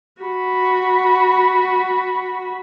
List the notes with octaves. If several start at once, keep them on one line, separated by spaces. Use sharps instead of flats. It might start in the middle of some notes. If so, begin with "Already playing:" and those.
F#4 B5